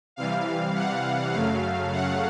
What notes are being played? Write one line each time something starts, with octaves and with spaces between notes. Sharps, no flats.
C3 E3 G3 F5
F#5
F#2 C#3 F#3 A3 F5
F#5